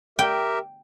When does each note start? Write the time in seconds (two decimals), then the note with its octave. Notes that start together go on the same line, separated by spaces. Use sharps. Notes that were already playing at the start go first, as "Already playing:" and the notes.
0.19 G4 A#4 E5 G5